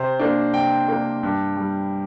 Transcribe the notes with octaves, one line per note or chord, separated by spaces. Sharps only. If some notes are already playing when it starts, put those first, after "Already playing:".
Already playing: C3 C5
A#3 D4
C3 G5
A#3 D4
G2
G3